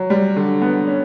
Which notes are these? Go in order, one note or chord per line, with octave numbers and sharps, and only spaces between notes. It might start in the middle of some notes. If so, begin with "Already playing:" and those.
Already playing: F#3
G3
D3
B3
C#4